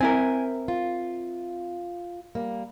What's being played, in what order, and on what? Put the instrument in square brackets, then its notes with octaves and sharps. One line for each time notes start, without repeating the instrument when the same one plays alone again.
[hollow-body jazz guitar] C4 E4 A#4 [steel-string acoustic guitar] G#5
[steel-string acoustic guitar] F4
G3 A#3